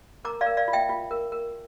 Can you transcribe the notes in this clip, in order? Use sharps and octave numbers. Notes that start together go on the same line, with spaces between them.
A#4 A#5 D6
D5 F5
A#4
D5 F5
F4
E5 G5
F4
A#4
A#4